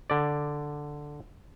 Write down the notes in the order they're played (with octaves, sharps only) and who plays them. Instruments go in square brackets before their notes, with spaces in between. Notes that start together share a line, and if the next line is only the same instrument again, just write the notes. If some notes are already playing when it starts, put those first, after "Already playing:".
[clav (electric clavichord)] D3 D5